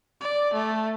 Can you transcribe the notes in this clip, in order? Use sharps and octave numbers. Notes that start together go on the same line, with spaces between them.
D5
A3